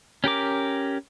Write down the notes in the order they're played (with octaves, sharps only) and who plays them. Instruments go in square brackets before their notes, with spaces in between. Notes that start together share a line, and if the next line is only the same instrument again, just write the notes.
[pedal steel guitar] C#4 G4 A#4 D6